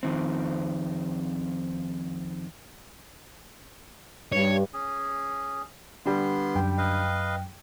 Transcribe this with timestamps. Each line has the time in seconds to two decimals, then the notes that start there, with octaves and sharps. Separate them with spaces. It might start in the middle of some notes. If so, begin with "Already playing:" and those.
0.03 F2 D#3 C4
4.32 G2 C#5
4.73 C#4 G#4
6.05 D3 G3 B3 C6
6.55 F#2 G5
6.78 B4 D#5 F5